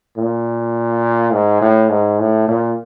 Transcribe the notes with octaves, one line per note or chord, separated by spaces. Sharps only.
A#2
G#2
A2
G#2
A2
A#2